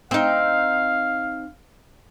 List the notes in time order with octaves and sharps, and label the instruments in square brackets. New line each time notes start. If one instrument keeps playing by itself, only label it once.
[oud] C4 D#4 [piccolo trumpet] F5